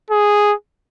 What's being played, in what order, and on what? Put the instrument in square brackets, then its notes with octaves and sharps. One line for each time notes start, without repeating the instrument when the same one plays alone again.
[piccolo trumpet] G#4